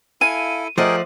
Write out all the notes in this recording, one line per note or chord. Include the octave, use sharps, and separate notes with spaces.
E4 A4 F5 G#5 D#7
F3 A3 G#4 A#4 D5 D#5 F#5 G5